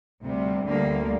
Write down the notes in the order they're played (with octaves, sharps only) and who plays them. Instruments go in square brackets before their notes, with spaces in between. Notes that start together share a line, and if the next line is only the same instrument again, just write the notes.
[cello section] D2 C3 G3
D2 D3 G3 A#3